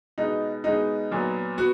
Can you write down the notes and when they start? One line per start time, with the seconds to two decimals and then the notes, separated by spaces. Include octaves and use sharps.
0.18 B2 G#3 B3 D#4
0.64 B2 G#3 B3 D#4
1.11 A#2 F#3 B3
1.58 B3 F#4